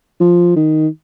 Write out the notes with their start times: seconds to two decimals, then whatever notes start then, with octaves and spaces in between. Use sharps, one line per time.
0.20 F3
0.56 D#3